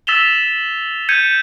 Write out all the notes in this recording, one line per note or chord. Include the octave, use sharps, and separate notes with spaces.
E6 A6 B6 E7 F7 G7
G6 G#6 C#7 D#7